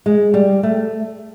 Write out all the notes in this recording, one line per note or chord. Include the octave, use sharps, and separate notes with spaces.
G#3
G3
A3